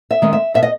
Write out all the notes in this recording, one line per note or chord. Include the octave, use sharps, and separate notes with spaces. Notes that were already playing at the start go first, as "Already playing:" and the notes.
E5
D#3 G#3 C#4
E5
B2 E5
D#5